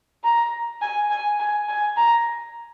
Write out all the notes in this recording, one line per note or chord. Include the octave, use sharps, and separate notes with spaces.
A#5
G#5
G#5
G#5
G#5
A#5